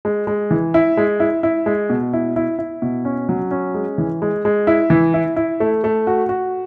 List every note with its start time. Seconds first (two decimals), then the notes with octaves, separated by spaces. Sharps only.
0.05 G#3
0.27 G#3
0.51 E3
0.74 E4
0.97 G#3
1.20 E4
1.43 E4
1.66 G#3
1.90 B2
2.13 E4
2.36 E4
2.59 E4
2.82 B2
3.05 C#4
3.29 F#3
3.51 C#4
3.74 G#3
3.98 E3
4.22 G#3
4.45 G#3
4.67 E4
4.90 E3
5.14 E4
5.36 E4
5.60 A3
5.84 A3
6.07 F#4
6.29 F#4